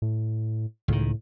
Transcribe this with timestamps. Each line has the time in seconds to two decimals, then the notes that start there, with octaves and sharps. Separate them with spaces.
0.02 A2
0.88 C#2 A2 D#3